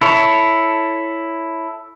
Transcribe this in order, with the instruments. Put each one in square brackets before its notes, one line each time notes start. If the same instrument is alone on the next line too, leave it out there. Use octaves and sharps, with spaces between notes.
[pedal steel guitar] E4 A4 C#5